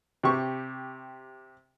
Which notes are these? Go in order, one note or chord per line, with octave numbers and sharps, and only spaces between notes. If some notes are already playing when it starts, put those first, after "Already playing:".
C3 G4 C#6